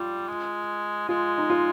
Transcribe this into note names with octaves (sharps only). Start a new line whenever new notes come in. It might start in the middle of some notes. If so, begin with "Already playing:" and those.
Already playing: G3 F4
G#3
G#3 F4
D#4
F4